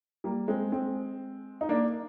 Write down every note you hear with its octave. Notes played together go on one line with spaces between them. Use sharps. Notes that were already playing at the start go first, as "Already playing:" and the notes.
G3 A#3
G#3 C4
G#3 C4
D#4
A#3 D4